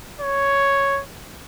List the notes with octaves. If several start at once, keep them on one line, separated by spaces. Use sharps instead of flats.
C#5